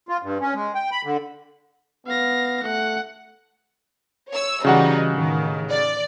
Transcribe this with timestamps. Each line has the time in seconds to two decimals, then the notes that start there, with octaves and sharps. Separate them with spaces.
0.09 F4
0.23 G2
0.41 C#4
0.54 G#3
0.75 G5
0.92 B5
1.05 D3
2.06 B3 F5 A#6
2.63 A3 F#5
4.30 C#5 E6
4.65 C#3 E3 G3 D#4 F#4 F#5
5.11 A1 D#3
5.70 D5